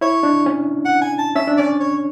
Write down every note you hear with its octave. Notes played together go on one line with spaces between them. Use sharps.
E4 C#5
D4
C#4
F#5
G#5
A5
C#4 E5
D4
C#4 D5
C#5